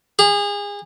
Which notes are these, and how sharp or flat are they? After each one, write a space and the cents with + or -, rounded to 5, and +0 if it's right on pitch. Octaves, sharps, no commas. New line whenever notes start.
G#4 -30